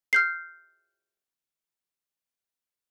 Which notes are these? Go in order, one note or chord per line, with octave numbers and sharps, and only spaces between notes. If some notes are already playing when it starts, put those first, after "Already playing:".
F6 G6 C7